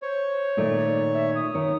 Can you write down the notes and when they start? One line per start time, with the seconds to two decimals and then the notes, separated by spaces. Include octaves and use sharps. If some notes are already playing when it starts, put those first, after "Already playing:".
0.02 C5 C#5
0.57 A#2 D#3 A3 D5
1.14 E5
1.35 D#6
1.55 D#3 C#5